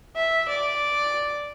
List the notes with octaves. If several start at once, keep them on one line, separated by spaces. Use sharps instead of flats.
E5
D5